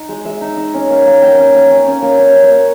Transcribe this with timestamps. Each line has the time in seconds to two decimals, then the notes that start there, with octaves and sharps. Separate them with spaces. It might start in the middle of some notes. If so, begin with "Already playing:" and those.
Already playing: D#4
0.09 G#3
0.25 G#3 E5
0.41 D#4
0.57 D#4
0.74 C#4
0.89 A#3
1.06 A#3
1.22 A#3 G5
1.39 C#4
1.55 A#3
1.71 C#4
1.87 C#4
2.02 A#3
2.19 C#4
2.36 C#4
2.44 C#5
2.51 A#3